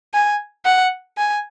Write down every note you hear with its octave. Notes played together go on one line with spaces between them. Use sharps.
G#5
F#5
G#5